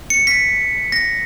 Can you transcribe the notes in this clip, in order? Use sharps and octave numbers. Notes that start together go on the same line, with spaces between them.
C#7
B6
A#6